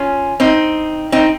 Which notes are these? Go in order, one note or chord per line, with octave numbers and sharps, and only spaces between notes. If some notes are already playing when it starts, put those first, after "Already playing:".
Already playing: C#4 F4
C4 D#4
C4 D#4